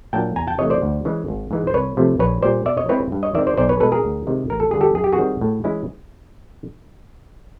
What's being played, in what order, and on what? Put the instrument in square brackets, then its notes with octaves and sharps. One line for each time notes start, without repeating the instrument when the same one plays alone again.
[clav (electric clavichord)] A#2 F#3 A#3 D4 G5 A5
E2 G#5 A#5
G5 A5
C3 E3 A3 C#5 D#5
C5 D5
D2
C#3 E3 G#3
G#1
G#2 E3 G#3
C5
C2 B4 C#5
C3 F3 A3
A#1 B4 C#5
A#2 G3 C5 D5
B2 D5 E5
C#5 D#5
G#3 C4 E4 B4 C#5
G2
C#5 D#5
D#3 G#3 C4 D5 E5
C5 D5
B1 C5 D5
B4 C#5
B2 G#3 A4 B4
G#4 A#4
D2
C3 D#3 G#3
A1 A#4
A4
G2 D3 G#4
G4 A4
F#2 G#4
G4
F#4 G#4
D#3 G3 C4
A2
E3 G#3 C#4 E4